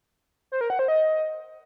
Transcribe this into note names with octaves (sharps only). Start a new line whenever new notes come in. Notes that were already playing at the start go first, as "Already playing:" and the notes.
C5
A#4
F#5
C5
D#5